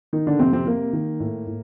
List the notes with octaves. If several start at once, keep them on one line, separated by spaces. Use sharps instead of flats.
D#3 D#4
D3 D4
F2 C3 C4
C3 C4
C3 A#3
D#3
A2
A2